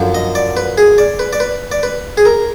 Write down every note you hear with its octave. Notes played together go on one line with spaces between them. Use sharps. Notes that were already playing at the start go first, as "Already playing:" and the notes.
Already playing: F#2 D3 F3
D#5
D5
B4
G#4
D5
B4
D5
B4
D5
B4
G#4
A#4